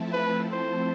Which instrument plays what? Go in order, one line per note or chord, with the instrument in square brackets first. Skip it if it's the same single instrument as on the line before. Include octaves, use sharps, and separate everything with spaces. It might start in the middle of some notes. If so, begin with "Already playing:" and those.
Already playing: [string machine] F3 A3 C4 E4 A4
[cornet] B4
C5